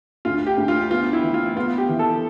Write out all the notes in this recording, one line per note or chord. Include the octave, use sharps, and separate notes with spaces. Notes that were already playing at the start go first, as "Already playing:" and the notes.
D2 F4
G4
D2
F4
B3 F4
E4
E3
F4
B3 F4
G4
E3
A4